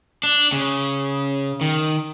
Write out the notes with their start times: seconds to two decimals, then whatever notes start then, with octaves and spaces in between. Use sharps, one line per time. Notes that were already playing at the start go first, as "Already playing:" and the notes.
0.23 D4
0.53 C#3
1.61 D#3